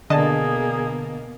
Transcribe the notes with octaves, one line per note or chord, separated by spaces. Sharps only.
B2 D3 A#3 G#4 D#5 A5